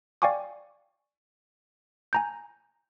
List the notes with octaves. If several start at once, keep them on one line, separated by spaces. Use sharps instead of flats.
D5 F5 G5 G#5 C#6 D6
G#5 A#5 G6